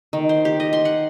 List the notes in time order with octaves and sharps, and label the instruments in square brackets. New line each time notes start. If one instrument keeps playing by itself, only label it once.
[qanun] D#3
C5
G4
D#5
C6
F#5